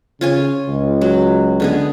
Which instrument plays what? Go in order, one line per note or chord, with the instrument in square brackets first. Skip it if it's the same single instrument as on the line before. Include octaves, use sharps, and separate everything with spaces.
[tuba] C#3 [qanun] F4 C#5 G#5
[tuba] C#2
[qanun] F#3
D3 B3 G#4